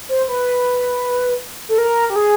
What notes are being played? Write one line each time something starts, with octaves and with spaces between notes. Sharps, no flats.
C5
B4
A4
A#4
G4
G#4